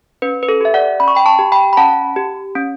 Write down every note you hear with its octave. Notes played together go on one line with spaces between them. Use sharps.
C#4 B4
B4
A4
G4 E5
D5 F#5
C#4 B5
C#6
G5 B5
A5 C#6
G4
G5 B5
B5
C#4 F#5 A5
G4
C#4